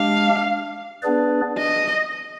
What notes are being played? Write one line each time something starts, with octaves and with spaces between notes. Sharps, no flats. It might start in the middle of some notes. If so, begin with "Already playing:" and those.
Already playing: G#3 D4 G4 F5
B3 D4 G#4 B4 D5
D#5